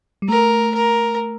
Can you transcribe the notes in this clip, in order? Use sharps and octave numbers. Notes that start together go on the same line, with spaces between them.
G3
A3 A#4
A#4